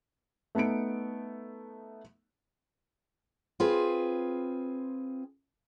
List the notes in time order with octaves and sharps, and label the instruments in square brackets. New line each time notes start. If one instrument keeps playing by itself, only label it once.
[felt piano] A3 B3 D#4 C#7 D7
[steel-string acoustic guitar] C4 F4 G#4 B4